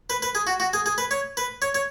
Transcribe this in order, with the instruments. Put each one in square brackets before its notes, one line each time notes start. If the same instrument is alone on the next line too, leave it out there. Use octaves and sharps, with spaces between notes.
[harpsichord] B4
B4
G#4
F#4
F#4
G#4
G#4
B4
C#5
B4
C#5
C#5